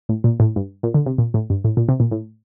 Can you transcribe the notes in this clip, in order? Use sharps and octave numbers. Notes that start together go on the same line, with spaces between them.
A2
A#2
A2
G2
A#2
D3
C3
A#2
A2
G2
A2
A#2
C3
A#2
A2